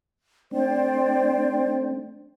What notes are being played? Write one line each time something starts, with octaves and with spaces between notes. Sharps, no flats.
A3 C4 D4 C5 D5 G5